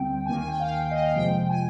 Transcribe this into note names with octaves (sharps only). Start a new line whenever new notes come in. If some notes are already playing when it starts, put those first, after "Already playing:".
Already playing: D2 D3 G3 C4 G5
D#2 D#3 A#3 G#5
G#5
G5
F5
G5
F5
D#5
F5
F2 C3 F3 G#3 G5
G#5